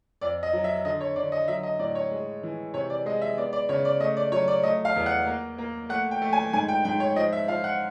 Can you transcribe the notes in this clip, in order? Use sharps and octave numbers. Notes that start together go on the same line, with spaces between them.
F2 D5
D#5
F#3
E5
D3 D#5
C#5
D3 D5
D#5
F#3 E5
D#5
A2 D5
C#5
G#3
E3
C3 C#5
D5
G#3 D#5
E5
B3 D5
D5
C#3 C#5
D5
A3 D#5
D5
F#3 C#5
D5
A3 D#5
F5
E2
F#5
A#3
A#3
A3 F#5
G5
A3
G#5
G#2 G#5
G5
G#2 G5
C#5
F3 D#5
E5
F3 F5
F#5